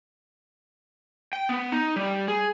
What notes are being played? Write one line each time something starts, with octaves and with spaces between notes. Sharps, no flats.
G5
B3
D#4
G3
G#4